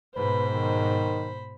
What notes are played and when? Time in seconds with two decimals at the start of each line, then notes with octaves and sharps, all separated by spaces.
0.16 G#2 B2 B4 C5 B5
0.53 D#3